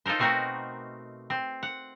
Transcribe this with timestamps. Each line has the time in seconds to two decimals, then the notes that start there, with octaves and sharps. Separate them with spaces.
0.06 D#4 F4 A4 A#4 C5
0.19 B2 A3 C4 F#4 A#4
1.30 C4
1.63 F#5